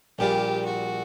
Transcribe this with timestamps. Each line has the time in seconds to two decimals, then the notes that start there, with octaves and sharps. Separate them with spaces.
0.19 A#1 A#2 G3 G4
0.66 F#4